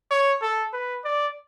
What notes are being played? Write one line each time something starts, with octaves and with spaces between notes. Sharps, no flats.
C#5
A4
B4
D5